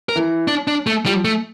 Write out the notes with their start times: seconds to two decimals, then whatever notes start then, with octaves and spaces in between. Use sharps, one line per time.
0.09 A#4
0.16 E3
0.48 D4
0.67 D4
0.87 A3
1.06 F3 G3
1.25 A3